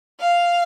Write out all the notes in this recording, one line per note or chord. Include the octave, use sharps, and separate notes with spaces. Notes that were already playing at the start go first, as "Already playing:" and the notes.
F5